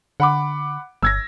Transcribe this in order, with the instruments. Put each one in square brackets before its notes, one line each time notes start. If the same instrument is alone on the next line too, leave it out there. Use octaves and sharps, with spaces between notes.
[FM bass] D3 [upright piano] F#5 B5 D6
[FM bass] G1 [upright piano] E6 G#6 A#6